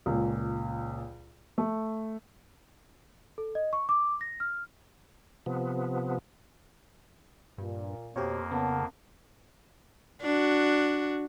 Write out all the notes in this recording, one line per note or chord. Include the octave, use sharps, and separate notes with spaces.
C#2 A#2
A3
A4
D#5
C#6
D6
A#6
F6
C3 F3 B3
G2 A#2
F2 B2 A#3 G4 C5 C#5
C#3 B3 A#4 F#5 A5
D4 F#4